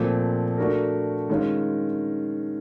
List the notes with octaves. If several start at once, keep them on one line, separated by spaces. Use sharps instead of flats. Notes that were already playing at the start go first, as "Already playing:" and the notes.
Already playing: A#2 F3 A3 C4
A3 D4 F#4 A#4
D#3 G#3 C#4 F4